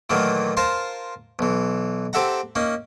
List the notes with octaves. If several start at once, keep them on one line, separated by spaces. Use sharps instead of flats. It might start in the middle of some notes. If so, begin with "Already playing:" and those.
A#2 D#3 E3 F#3 A3 A#3
F4 A#4 C5 A5 A#5
B1 E3
C4 G4 A4 E5 F#5 A#5
A#3 C#4 D#4